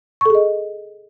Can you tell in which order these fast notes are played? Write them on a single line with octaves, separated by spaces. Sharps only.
C#6 A4 G#4 D#5